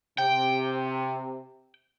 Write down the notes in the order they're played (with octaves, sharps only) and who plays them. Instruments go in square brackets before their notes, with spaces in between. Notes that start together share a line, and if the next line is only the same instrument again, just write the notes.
[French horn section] C3 [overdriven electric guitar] G5